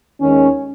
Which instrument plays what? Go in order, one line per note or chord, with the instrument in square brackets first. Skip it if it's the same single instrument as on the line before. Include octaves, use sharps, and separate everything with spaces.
[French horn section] D#2 D#3 G#3 C#4